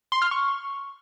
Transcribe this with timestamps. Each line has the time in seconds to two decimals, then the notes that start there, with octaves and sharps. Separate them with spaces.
0.12 C6
0.22 F6
0.31 C#6